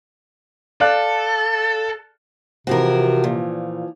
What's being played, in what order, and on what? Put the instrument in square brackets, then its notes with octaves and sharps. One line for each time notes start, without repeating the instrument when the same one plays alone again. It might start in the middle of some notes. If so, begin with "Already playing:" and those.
[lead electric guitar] A4 [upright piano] D5 F5 F#6
[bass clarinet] C3 [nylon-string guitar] E3 F3 C4 [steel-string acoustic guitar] F#4 A#4
[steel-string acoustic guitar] A#2